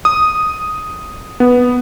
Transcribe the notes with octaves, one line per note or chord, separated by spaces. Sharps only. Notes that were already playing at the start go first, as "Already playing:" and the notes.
D#6
B3